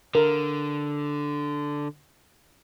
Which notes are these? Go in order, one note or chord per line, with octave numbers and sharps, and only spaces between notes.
D3 A#4